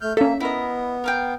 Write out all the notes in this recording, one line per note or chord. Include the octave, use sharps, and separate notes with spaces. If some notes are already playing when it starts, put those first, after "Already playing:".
A3 F6 G6
A#3 C#4 A4 E5
B3 E4 A#4 D#5
A#4 F5 G5